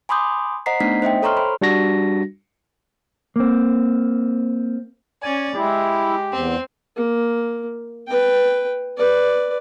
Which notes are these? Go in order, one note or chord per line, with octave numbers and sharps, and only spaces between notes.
G#5 B5 C6 D6 D#6 G6
C5 D#5 F#5 A#5 B6 C7
A3 B3 D4 D#4 B6
C5 D#5 E5 G5
A4 C#5 A#5 C6 C#6 F6
C5 B5
G3 D4 F#4 A#6
A#3 C4
C#4 D5 G#5
G#3 E4 G4
E2 C4
A#3
B4 G5
B4 D5